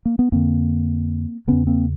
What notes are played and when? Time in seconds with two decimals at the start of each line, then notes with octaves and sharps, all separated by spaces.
0.06 A#3
0.19 B3
0.32 F2 D3 A#3 C4
1.47 E2 C#3 B3 C#4
1.67 A#3 C4